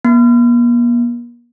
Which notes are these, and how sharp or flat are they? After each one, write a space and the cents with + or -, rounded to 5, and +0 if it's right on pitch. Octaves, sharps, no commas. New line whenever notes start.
A#3 +45